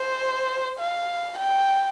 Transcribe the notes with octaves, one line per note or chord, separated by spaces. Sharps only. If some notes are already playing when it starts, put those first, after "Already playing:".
Already playing: C5
F5
G5